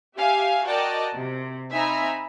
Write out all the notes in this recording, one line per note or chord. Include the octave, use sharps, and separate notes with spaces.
G4 E5 F5 G#5
F#4 A#4 D5 D#5 G5 A5
C3
C4 D#4 E5 G#5 A#5 B5